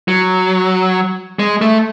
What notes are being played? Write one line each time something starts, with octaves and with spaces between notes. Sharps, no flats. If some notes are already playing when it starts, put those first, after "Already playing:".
F#3
G#3
A3